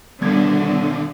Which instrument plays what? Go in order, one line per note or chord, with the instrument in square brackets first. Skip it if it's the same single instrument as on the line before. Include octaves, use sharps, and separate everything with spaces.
[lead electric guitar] D#2 B2 [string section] D3 [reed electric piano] G3 B3 G#6